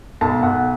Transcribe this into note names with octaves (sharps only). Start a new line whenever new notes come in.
B1 A5
B1 F#5